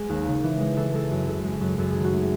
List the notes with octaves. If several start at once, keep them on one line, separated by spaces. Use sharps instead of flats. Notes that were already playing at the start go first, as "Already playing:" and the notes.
Already playing: G#3 G#4
D#2
C#3
E3
G#3
E3 A4
G#3 A4
F#2
C#3 A4
G#3
F#2
F#2 A4
D#3 G#4
F#4
A3
G#4